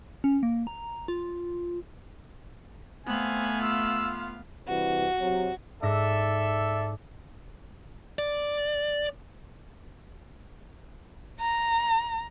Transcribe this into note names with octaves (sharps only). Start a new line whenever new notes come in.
C#4
A#3
A#5
F4
A3 B3 C4 F5 G#5
F4 E6
G2 C3 E3 F#4
C3 F#3
G#2 A4 D5 E5 A#6
D5
A#5